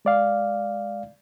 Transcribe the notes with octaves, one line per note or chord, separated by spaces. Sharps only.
G#3 D5 F5